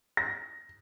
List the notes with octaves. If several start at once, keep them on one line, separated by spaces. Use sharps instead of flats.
A#6